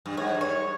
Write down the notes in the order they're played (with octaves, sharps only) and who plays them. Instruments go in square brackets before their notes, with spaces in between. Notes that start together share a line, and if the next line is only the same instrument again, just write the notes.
[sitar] G2
[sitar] G#2 [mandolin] C#5
[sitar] G2
[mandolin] C#5